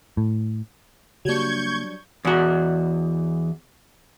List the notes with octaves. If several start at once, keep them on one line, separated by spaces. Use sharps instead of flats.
A2
C#3 F#3 G3 A#3 D4 C#6 G6 G#6
E2 F#4